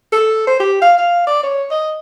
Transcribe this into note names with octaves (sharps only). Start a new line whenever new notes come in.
A4
C5
G4
F5
F5
D5
C#5
D#5